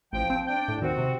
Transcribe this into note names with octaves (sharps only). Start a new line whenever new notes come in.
A1 F3 G5
C4
D4 G5
A2
D#2 C4 F#4
C3